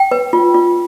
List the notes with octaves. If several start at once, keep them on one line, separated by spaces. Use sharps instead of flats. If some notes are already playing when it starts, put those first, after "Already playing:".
Already playing: G5
B4
F4
F4